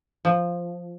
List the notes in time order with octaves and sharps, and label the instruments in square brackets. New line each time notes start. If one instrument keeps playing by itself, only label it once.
[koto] F3